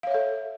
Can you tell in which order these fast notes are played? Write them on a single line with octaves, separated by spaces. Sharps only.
F5 C#5 E5 A4